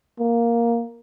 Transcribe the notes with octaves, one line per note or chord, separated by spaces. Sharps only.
A#3